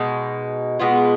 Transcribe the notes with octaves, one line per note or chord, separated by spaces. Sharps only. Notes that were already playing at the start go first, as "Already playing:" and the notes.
Already playing: B2 G#3 D#4
B2 G#3 B3 F4